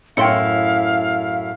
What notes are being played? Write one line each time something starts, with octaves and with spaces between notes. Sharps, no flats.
F#2 A2 E4 F5 G5 C6 C#7